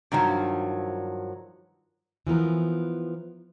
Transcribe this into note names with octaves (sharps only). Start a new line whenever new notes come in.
G2 D#3 F3 F#3
E3 F3 B3 A#4